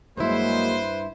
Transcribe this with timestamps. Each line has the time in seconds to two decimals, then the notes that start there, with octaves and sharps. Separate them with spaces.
0.17 G2 F#3 G#3 A#3 E4 B4 C5